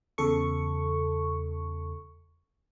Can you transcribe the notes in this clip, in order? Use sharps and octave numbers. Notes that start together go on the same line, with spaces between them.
E2 C#3 A4 C#6